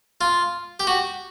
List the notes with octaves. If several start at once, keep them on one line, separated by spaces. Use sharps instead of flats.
F4
G4
F#4